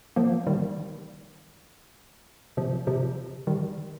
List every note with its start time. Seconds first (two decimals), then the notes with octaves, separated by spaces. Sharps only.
0.16 F3 A#3
0.47 D#3 G3
2.57 C3 F3
2.87 C3 F3
3.47 D#3 G3